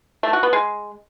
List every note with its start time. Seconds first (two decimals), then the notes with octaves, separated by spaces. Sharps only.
0.23 A3
0.33 F#4
0.43 B3
0.53 G#3